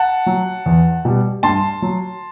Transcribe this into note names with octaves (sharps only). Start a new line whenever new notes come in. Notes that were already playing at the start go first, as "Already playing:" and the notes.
Already playing: F#5 A5
F#3
E2
B2 G3
G2 A5 C6
F#3